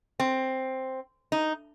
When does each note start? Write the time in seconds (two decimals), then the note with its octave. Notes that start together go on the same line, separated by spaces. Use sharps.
0.20 C4
1.32 D#4